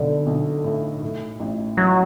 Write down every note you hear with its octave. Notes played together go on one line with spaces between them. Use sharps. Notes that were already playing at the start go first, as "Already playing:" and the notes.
Already playing: B1 D3 B3
B1
A2
A2
A1
A1 F#3